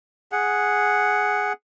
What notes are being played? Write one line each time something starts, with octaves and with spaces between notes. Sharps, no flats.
G#4 F#5